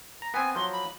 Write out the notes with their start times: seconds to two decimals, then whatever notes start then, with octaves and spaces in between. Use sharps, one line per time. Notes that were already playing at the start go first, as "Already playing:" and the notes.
0.22 A#5
0.34 B3 C4 G#5
0.55 F3 F#3 C6
0.72 B5